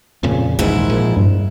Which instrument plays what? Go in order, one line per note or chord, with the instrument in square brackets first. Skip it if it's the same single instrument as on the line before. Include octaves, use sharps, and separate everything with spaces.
[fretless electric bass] F2 A#2 C#3
[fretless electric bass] A#1 D#2 E3 [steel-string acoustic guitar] G#2 E4
[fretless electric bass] A#2 F3
[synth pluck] G2